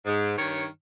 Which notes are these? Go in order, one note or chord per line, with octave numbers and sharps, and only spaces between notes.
G#2
G2 D#3 C#5